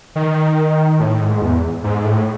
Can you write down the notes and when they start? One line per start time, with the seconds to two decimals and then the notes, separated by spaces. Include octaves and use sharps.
0.16 D#3
1.00 A2
1.21 G#2
1.42 E2
1.84 G#2
2.04 A2